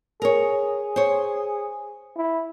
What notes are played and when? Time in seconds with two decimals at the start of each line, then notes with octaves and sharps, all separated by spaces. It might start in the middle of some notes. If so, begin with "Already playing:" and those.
0.22 G#4 A#4 C#5
0.96 C5 C#5
2.17 E4